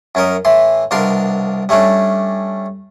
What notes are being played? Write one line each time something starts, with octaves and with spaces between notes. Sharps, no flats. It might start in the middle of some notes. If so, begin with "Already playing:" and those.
F#2 C#4 A#4 D#5
A2 E3 C6
C2 B2 D4 A#4 F5 C6
G3 A3 C#4 D4